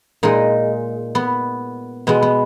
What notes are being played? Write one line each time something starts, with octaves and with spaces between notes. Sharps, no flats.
A#2 G#3 D#4
B3
B2 G#3 B3
B3